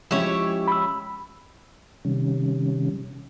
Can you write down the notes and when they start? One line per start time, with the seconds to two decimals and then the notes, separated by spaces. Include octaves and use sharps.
0.11 F3 G#3 C#4 E4 G4 C#5
0.68 B5 E6
2.05 C3 D#3 G3 C#4